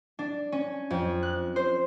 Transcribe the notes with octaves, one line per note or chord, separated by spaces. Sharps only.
D4
C#4
F2
F#6
C5